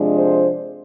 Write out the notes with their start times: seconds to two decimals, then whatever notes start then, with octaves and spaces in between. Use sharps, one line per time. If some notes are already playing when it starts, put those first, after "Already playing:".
Already playing: C3 F3 G#3 D4
0.15 C5